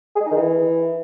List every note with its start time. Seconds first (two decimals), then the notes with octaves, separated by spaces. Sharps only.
0.15 G#4
0.21 G#3
0.26 D#4
0.31 D#3
0.36 E3